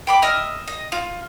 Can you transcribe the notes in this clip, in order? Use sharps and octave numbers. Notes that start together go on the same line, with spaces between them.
G5 B5 D6
D#5 E5 F6
D#5
F4